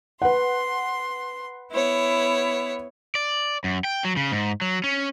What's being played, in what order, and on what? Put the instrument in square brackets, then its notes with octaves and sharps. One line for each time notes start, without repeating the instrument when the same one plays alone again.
[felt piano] B4 F#5 [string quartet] C6
[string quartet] B3 E4 C#5
[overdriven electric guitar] D5
F#2
G5
F#3
C#3
G#2
F#3
C#4